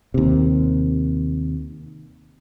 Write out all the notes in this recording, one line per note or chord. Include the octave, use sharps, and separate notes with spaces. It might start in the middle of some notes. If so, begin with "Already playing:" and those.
D#2 C3